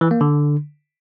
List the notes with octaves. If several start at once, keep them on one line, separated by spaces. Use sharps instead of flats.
E3
A#3
D3